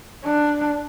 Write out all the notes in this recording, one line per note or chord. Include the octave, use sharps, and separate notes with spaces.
D4